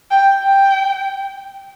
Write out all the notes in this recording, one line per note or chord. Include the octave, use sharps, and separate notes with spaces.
G5
G5